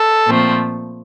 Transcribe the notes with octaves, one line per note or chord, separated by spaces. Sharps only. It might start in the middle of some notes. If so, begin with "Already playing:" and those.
Already playing: A4
A#2 F3 A3 C4